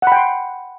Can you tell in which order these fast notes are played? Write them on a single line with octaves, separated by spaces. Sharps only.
F#5 B5 G5 C6